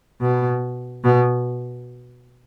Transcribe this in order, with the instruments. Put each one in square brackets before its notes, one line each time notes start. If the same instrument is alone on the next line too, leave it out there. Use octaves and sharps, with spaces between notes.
[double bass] B2
B2